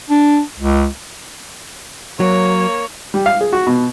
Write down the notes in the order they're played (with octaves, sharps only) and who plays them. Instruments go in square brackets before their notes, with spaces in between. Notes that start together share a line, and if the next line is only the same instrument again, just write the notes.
[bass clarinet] D4
C#2
[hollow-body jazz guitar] F#3 [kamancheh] A#3 C#5
[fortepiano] G3
F5
G#4
F#4
B2